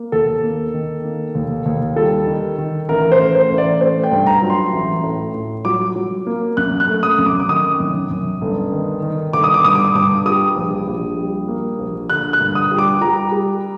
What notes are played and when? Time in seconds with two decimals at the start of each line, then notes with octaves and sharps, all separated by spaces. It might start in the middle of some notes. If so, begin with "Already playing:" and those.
Already playing: A#3
0.12 D#2 A4
0.43 A#3
0.74 D#3
1.04 A#3
1.35 D#2
1.66 D#2
1.96 G3 A4
2.27 D#3
2.58 D#3
2.89 A1 A#4
3.12 C5
3.19 A3
3.35 C5
3.50 A1
3.58 D5
3.81 A3 C5
4.04 G5
4.12 G2
4.27 A#5
4.42 F#3
4.50 C6
4.73 A1
5.03 A2
5.34 A2
5.65 F#3 D6
5.96 F#3
6.27 A#3
6.57 F#2 F#6
6.80 F#6
6.88 A3
7.03 D#6
7.18 F#2
7.26 D6
7.40 D6
7.49 D#3 D#6
7.80 F#2
8.11 F#2
8.41 G1
8.72 D#3
9.02 D#3
9.33 G1 D6
9.44 D#6
9.54 D6
9.64 G2 D#6
9.75 D6
9.85 D#6
9.95 G2 D6
10.26 G3 D#6
10.56 A#1
10.87 A#1
11.17 G3
11.48 A#3
11.79 A#1
12.10 D3 F#6
12.33 F#6
12.40 G2
12.55 D#6
12.72 G3
12.79 D6
13.02 G3 A#5
13.32 G3